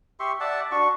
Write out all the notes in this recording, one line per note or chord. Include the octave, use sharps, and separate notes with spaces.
G4 E5 C6 C#6
D5 E5 F#5 A5
D4 F#4 C#6